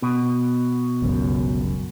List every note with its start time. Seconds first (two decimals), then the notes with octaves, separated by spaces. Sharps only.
0.02 B2
1.02 G1 C#2 F#2